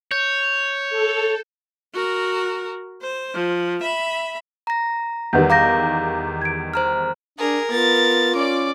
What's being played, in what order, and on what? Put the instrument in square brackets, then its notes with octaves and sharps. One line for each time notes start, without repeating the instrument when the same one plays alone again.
[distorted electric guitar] C#5 [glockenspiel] G6
[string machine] A4
[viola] F#4 A#4
C5
F3
E5 B5
[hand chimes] A#5 A#6
[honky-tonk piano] E2 D#3 G3 [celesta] B4 F#5 G6
[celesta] F5 A#6 [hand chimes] A#5 D6 G6
[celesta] G#6 D7
[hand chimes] C5 A#5 F6
[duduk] D4 [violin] G#4 [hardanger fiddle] A#4
[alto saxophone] B3 [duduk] F4 [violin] A6
[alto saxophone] C#4 [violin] D5 D6